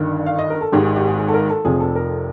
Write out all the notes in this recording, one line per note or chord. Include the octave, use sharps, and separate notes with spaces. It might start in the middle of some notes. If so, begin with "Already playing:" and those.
Already playing: G1 G2 D#3
F5
D#5
A#4
A4
G#1 G#2 D#3 G#3 G4
G#4
G4
G#4
G#4
A4
A#4
A4
F1 F2 C3 F3 G#4
A4
A#4